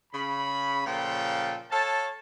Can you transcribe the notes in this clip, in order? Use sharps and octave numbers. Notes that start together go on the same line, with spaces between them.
C#3 B5
A#2 C#3 F3 F4 A4 G5
A4 C#5 F5 A5